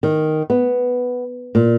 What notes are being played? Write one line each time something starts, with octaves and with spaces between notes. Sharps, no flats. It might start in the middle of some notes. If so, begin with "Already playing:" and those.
D#3
B3
A#2